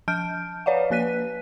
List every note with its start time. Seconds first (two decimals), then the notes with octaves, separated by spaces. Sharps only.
0.08 F3 A5 F6 G6 D7
0.66 B4 C#5 D5 F5 F#5
0.90 F3 A#3 B4 F#6 B6 D#7